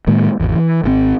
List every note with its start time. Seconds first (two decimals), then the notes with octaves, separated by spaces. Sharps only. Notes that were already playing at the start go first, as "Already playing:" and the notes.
0.07 A2 D#3 G#3 A#3
0.40 G#1 E2
0.55 E3
0.84 G#1 D3 C4